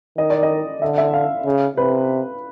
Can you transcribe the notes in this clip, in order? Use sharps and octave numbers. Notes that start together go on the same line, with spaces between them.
D#3 D#5
D5
D#5
D3 E5
E5
F5
C#3
C3 B4